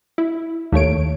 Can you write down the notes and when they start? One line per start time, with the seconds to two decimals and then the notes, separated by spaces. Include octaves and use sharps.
0.18 E4
0.72 D#2 A3 C#5 D7